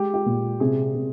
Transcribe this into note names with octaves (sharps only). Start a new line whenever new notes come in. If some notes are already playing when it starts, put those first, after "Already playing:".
Already playing: G#3 G4
G4
A#2
C3 G#4
C3